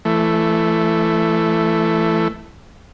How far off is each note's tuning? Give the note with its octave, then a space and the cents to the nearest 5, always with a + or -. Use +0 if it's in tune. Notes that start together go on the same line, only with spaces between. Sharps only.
E3 +25 A3 +0